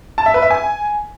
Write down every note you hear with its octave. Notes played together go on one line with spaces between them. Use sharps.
A5
E5
B4
E5
G#5